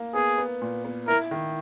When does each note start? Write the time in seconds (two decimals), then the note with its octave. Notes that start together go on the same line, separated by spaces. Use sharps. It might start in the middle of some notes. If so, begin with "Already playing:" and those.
Already playing: A#3
0.14 B3 G#4
0.38 B3
0.62 A#2
0.85 B3
1.08 E4 A#4
1.31 D#3